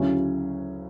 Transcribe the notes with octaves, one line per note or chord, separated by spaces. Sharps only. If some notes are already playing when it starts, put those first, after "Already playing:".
Already playing: D2 C#3 F#3 C#4 E4